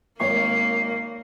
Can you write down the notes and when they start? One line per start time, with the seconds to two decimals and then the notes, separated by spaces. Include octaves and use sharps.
0.20 G#1 A#3 C#5 C#6 C7